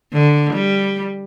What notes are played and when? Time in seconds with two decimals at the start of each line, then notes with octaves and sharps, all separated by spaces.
0.13 D3
0.53 G3